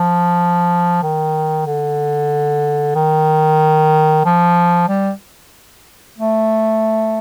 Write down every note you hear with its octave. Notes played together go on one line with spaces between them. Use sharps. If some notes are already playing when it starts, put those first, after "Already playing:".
Already playing: F3
D#3
D3
D#3
F3
G3
A3